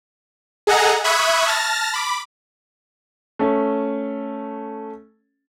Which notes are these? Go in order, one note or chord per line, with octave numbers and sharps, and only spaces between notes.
G#4 A4 D#5 F#5 G#5 A#5
E5 B5 C#6 D#6 F#6 G#6
A5 F6 A6 A#6
B5 D6
A3 C#4